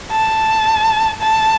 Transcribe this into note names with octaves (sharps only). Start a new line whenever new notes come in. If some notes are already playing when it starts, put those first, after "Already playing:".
A5
A5